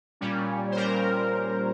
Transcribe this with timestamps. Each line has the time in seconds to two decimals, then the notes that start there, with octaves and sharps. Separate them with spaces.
0.21 A#2 G3 C#4
0.71 C5
0.76 A#2 G3 A#4